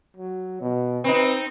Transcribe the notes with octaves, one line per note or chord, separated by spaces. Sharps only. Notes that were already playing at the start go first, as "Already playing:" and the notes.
F#3
B2
C4 D#4 B4